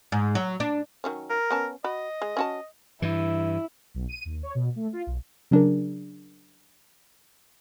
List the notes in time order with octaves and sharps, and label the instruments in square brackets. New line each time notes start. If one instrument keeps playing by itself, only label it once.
[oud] G#2
F#3
D4
[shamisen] D#3 F#3 C#4
[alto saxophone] A#4
[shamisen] B3 C#4 A5
[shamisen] F#4 B5 [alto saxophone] D#5
[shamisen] G#3
C#4 F#4 A5
[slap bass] G2 E3 [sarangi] E4
[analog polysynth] B1
D#7
D#2
C#5
B2
A3
F4
B1
[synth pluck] C#3 F#3 D4 G#4 A#4